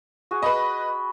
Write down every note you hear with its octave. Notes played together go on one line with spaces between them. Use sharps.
F#4 G#4
B4 D#5 B5